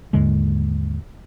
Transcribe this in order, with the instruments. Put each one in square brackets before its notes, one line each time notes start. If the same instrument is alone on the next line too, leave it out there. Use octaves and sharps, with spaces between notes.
[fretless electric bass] D#2 G#2 D3 G#3